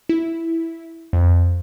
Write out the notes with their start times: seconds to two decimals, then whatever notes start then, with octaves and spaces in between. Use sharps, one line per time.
0.09 E4
1.13 F2